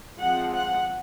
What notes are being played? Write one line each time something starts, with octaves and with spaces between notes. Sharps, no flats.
F3 G#3 C4 F#5
F#5